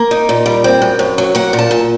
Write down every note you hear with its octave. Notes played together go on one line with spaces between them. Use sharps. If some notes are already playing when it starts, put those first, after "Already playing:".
Already playing: A#3 A#4
D#4
A#2
G3
C4
F#2
F#2
F#3
A#3 F#5
A#2
A5
A#2